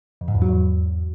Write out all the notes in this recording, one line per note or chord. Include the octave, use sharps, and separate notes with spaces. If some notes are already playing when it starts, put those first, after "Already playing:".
F2
G#2
E2
F#3
E2